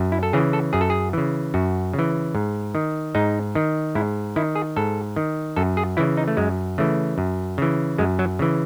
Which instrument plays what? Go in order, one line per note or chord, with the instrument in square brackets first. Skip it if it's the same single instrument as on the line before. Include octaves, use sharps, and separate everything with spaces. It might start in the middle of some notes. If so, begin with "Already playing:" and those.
Already playing: [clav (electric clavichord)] F#2
E4
A4
C#3 E3 G#4
A4
F#2 G#4
A4
G#4
C#3 E3
F#2 F#4
C#3
E3
G#2
D#3
G#2 D#4
D#3
G#2 E4
D#3 E4
G#4
G#2 A4
D#3
F#2 A4
G#4
C#3 E3 E4
D#4
A3
F#2 G#3
C#3 E3 A3
F#2
C#3 E3
F#2 G#3
F#3
C#3 E3